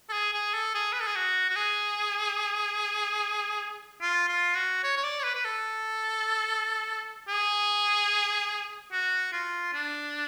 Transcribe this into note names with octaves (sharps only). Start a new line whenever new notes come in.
A4
G#4
G#4
A4
G#4
B4
A4
G#4
F#4
F#4
G#4
F4
F4
F#4
C#5
C#5
D5
C#5
B4
B4
A4
G#4
F#4
F4
D4